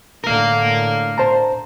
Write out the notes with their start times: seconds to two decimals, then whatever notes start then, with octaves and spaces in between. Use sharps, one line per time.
0.24 A2 D3 A#4 F5
1.18 C5 A5 A#5